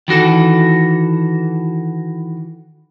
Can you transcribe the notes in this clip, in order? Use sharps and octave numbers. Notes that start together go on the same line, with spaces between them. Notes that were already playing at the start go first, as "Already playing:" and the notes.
D#3 E3 F#4 A4